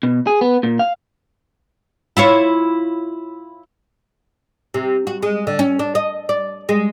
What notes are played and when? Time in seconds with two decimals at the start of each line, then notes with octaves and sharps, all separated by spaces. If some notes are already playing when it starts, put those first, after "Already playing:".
0.03 B2
0.27 G#4
0.41 B3
0.63 A#2
0.79 F5
2.17 E4 F4 C#5
4.74 C3
5.07 F#4
5.22 G#3
5.47 D3
5.59 C#4
5.79 D4
5.95 D#5
6.29 D5
6.69 G#3